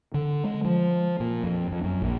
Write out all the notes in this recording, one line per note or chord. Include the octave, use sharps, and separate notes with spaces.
D3
G#3
F3
A#2
F2
F2
F#2
A#1